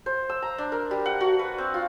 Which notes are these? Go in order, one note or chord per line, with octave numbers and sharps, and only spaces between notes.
C5
E6
A#5
D4
A#4
G3
F#5
F#4
B4
C4
F4